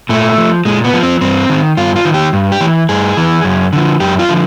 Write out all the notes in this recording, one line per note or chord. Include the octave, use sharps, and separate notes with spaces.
A#2 A3
F3
A#2 G#3
B3
F3
C4
G2 C4
D#3
G2 F4
F4
D#3
G4
G2
G4
E3
G2 G#4
E3
F#2
D3 F3
F#2 G4
F4
D3 F3